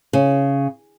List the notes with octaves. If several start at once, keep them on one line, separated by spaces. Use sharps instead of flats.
C#3